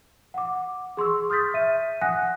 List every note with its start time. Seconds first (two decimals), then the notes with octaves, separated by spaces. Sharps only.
0.34 F#5 D6
0.97 G#4 C6 C#6 E6
1.30 D#6 F6 G6 A6 B6
1.54 E5 D#7
2.01 F#5 G#5 D#6 F#6 A#6